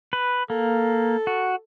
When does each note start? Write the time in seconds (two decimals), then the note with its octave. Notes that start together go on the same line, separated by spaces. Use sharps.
0.13 B4
0.50 A#3 A4
1.27 F#4